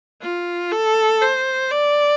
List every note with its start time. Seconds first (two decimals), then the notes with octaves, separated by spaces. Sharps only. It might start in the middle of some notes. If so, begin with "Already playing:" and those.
0.22 F4
0.71 A4
1.22 C5
1.71 D5